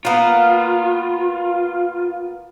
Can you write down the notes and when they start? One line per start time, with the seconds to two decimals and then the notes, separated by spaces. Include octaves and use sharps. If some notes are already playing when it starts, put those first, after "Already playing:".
0.05 A#3 B3 F4